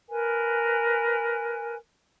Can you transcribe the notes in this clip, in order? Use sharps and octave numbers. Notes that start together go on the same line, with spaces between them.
A#4 B4 G#5